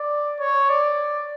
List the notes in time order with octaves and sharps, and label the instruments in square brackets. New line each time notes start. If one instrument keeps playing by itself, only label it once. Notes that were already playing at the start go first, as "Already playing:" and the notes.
Already playing: [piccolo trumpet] D5
C#5
D5